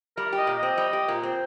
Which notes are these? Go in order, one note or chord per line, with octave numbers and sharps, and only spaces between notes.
G3 A#4
G4 D#5
A#2
C4 D#5
G3
G4
A#2
C4